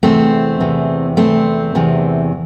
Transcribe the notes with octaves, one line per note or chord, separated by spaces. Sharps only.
E2 C3 E3 A3 C4
E2 C3 E3
E2 C3 E3 A3 C4
E2 C3 E3